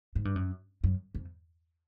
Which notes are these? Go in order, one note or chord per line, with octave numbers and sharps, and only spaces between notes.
G#2
G2
F#2
F#2
F2